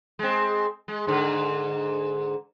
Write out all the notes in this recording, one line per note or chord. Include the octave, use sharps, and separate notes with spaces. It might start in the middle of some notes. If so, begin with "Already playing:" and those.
G#3 C4
G#3
G#2 D3